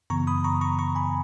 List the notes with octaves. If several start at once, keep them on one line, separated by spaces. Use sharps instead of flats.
F#2 C#3 E3 B3 A#5 C#6
B5 D#6
A#5 C#6
A#5 C#6
A#5 C#6
G#5 B5